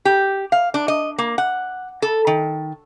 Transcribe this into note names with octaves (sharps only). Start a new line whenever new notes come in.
G4
F5
D4
D#5
A#3
F#5
A4
D#3